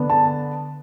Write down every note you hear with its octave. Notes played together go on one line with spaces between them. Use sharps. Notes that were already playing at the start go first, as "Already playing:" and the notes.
Already playing: D3 B3 D4
A5